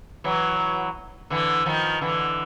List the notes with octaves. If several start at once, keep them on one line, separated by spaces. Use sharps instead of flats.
E3 F#3
D3 E3
D#3 F3
D3 E3